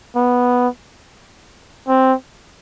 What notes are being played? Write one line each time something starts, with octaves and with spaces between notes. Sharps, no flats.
B3
C4